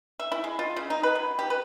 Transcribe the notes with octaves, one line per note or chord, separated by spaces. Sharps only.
E5
E4
G#3
F4
C#3
D#4
B4
F#3
G4
B4